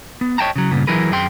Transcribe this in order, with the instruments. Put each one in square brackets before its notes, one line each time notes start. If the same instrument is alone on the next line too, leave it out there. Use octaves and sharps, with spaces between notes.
[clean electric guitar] B3
C#5 D#5 G5 A5 A#5
C#3 F#3
G2 A#2 C#3 B3
E3 F#3 E4 G#4 A#4 B4
F#2 G#4 G5 C6